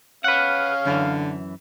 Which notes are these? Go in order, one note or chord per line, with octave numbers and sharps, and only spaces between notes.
C#4 B4 F5 F#5
F#2 D3 E3